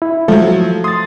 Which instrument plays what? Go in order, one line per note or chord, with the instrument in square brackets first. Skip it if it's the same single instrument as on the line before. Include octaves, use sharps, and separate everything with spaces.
[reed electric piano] E4
[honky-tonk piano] F3 F#3 [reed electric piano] A3
[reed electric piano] C6 A6 [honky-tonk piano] D#6